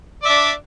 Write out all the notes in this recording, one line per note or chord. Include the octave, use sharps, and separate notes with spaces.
D4 D5 E5